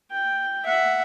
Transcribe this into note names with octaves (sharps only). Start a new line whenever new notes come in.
G5
E5 F#5